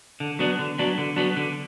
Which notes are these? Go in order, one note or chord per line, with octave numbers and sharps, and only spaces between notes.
D3
F#3 B3 D4
D3
F#3 B3 D4
D3
F#3 B3 D4
D3